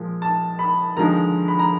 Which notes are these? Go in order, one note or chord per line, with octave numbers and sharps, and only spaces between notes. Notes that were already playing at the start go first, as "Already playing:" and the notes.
Already playing: A#2 F3 G#3
A5
B5
D#2 D3 F3 G#3 A#5
B5
A#5